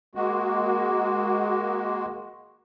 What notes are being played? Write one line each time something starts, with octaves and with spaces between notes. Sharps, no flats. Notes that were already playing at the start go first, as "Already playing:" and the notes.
G#3 A#3 F#4